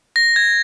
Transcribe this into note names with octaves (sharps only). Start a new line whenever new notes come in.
A#6
G#6